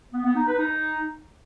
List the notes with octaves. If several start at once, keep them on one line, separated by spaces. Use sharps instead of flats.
B3
B3
D#4
B4
D#4